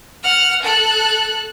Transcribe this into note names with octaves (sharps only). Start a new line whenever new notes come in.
F#5 F6
A4 F#6